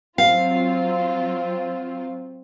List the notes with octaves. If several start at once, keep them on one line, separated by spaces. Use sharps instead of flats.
F#3 C4 F4 F5